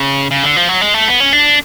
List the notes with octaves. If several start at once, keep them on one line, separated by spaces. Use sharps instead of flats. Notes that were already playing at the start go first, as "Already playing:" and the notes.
Already playing: C#3
C#3
D3
F3
F#3
G#3
A3
B3
C#4
D4